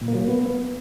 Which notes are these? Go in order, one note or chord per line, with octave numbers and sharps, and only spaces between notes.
A#2
A#3
F#3
A#3
B3